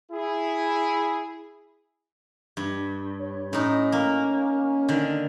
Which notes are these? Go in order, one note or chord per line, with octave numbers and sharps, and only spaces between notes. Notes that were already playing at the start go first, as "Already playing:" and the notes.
E4 G#4
G2
C#5
A2 C#4 D#4
A#3
D3 D#3